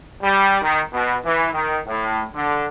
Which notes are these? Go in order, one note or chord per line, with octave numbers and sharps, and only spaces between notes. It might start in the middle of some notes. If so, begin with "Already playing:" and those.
G3
D#3
B2
E3
D#3
A2
D3